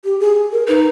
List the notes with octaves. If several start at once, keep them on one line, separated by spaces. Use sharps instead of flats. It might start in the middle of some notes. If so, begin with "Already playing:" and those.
G4
G#4
A#4
D#4 B4